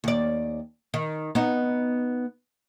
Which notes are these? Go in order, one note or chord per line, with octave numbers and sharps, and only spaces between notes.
D#2 D5
D#3
B3 D#4